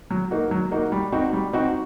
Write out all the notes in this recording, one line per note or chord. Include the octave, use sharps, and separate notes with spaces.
F#3
A#3 D#4 F#4
F#3
A#3 D#4 F#4
G3
C4 D#4 F#4
G3
C4 D#4 F#4